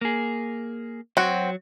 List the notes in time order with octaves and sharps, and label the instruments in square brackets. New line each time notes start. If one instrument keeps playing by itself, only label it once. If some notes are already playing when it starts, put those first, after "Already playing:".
[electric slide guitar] A#3 G#4
[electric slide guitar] F#3 C#5 [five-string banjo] C4 F#4